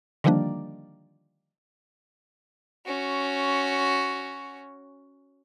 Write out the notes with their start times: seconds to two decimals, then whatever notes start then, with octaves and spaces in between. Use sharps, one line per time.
0.24 D3 D#3 F3 G3 A#3 D4
2.86 C#4 F#4